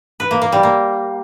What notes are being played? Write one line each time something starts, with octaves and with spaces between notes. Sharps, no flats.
B4
A#3
A#3
G3
A#3